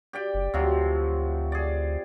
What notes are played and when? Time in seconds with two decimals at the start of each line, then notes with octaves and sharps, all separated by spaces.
0.13 G4 D5 G5
0.34 F#1
0.54 D2 C3 F3 F#3
1.52 G#4 D5